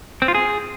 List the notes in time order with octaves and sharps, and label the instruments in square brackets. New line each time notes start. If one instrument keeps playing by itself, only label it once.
[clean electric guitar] C4
F4
G#4